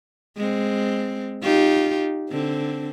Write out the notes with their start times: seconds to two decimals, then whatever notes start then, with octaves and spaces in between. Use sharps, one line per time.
0.37 G#3 C4
1.43 D#4 F4 G4
2.30 D3 C4